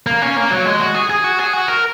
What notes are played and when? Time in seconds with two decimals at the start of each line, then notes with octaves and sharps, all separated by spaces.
0.07 A#3
0.22 C#4
0.36 A#3
0.50 F#3
0.66 G#3
0.80 F#4
0.95 G#4
1.10 G#4
1.24 F#4
1.39 G#4
1.53 F#4
1.68 A#4